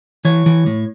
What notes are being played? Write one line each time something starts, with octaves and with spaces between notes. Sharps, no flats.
E3 C#5
E3
A2